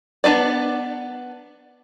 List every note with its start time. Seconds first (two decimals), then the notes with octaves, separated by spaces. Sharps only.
0.24 B3 D4 B4 D5